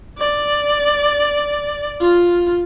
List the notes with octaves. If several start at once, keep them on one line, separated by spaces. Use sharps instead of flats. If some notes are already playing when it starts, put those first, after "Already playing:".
D5
F4